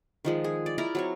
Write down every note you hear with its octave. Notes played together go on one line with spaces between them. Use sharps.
D#3 F3 G#3
G#4
D5
E4 A#4 D5 A#5
F#3 C4 C#5